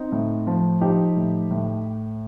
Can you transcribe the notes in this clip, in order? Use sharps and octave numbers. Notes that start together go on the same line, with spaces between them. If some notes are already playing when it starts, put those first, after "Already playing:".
Already playing: C4 D#4
A2
F3
F3 D#4 G4
A2
A2